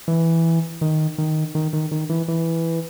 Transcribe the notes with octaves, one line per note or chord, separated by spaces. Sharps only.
E3
D#3
D#3
D#3
D#3
D#3
E3
E3